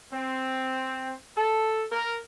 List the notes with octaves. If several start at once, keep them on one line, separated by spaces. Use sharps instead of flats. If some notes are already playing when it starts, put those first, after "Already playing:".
C4
A4
A#4